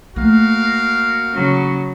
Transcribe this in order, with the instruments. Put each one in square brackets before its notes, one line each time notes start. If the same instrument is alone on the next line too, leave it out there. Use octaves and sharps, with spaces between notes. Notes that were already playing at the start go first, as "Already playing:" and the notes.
[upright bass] A3 A#3 [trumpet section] F#4 A#4 F5
[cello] C#3 F#3